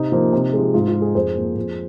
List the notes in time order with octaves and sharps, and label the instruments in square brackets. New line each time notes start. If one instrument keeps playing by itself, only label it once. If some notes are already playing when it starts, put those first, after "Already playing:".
Already playing: [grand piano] C3 D#4
F3 A#3
C3
F3 G#3
G#2 F4
F4
G#3
D#4 G#4
F2 G#4 C5
F3 A#3
F2